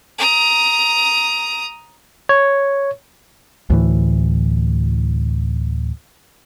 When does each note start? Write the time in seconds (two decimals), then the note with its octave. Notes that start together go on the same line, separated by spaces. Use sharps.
0.19 A#5 D#6
2.29 C#5
3.70 D2 A2 E3